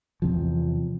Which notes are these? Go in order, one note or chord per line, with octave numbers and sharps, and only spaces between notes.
E2 C3 F3